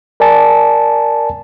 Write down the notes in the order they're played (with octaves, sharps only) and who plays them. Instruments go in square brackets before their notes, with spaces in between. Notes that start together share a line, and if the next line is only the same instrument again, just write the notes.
[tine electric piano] A#4 D5 G#5 A5